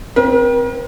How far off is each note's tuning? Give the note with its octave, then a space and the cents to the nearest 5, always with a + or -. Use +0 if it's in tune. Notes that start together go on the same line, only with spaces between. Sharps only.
C4 -5 A#4 +40